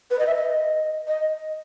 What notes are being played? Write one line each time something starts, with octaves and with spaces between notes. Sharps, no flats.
B4
D#5
E5
D#5
D#5